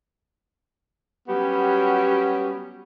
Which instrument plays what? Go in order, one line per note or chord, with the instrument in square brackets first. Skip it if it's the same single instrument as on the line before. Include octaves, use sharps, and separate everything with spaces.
[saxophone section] F#3 G3 B3 C#4 F#4 G4